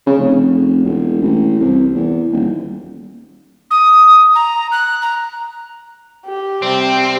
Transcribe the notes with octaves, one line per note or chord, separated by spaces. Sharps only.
C#3
F1
E1
A1
C2
E2
D#1
D#6
A#5
F#6
A#5
G4
C3 G3 C4